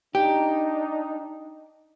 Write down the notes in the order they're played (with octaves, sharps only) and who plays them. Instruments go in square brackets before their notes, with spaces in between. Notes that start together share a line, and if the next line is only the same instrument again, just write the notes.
[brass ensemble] D4 D#4 [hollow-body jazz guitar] G4